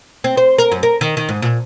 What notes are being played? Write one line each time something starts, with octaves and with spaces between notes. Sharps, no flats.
C4
C5
A#4
F#2
A#4
D#3
D#3
G#2
A#2